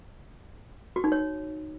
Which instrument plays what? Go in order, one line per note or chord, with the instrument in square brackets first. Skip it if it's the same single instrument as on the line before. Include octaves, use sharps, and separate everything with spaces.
[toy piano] F#4
D#4
C#5